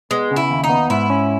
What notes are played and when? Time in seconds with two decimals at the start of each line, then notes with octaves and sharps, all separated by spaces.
0.11 G#3 B3
0.31 C#3
0.36 E4
0.51 D#2
0.64 D#4
0.70 B3
0.90 G#2 E4
1.10 C#4